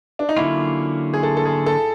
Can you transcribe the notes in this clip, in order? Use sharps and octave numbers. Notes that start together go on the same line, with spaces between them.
D4
D#4
D3 F#3 A#3 C#4 E4 F4
G#4
A4
A4
G#4
A4